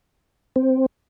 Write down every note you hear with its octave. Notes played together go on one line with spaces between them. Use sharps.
C4